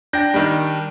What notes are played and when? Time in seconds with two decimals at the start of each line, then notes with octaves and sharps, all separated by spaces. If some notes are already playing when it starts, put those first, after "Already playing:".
0.13 D4 G5 G6 A#6
0.34 D#3 G3